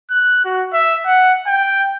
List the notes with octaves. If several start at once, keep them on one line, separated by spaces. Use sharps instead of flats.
F#6
F#4
E5
F#5
G5